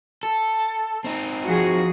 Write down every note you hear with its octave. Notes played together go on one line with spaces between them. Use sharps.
A4
C4 D#4
F3 F#4 G#4